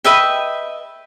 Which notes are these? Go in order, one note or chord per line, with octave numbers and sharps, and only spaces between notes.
B4 D#5 E5 G5